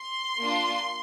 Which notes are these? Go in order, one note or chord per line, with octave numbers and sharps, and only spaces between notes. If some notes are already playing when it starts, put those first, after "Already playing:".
Already playing: C6
A#3 D4 F4